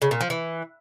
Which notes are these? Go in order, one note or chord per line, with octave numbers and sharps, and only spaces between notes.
C#3
A#2
F3
E3